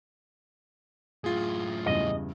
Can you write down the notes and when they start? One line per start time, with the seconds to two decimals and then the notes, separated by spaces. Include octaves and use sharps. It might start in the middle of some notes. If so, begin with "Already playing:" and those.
1.24 F#2 A2 F4 G#4
1.86 E2 G2 C#3 D#5